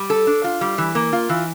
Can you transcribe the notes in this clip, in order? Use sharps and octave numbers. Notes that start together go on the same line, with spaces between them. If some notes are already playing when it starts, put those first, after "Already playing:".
Already playing: G3
A4
D4
F4
G3
E3
A#3
F4
E3